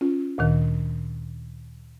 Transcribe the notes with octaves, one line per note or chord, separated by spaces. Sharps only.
C#4 F4
D2 A#2 D#3